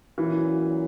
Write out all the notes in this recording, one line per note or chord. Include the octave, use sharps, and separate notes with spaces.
A#2 E3 F#3 C#4 F#4